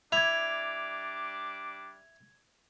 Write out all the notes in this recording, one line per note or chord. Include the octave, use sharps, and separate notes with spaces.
G3 D4 E4 D6 G#6 F7